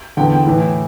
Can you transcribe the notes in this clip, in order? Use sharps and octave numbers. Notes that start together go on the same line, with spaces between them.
E2 D3 G5
G5
A2 E3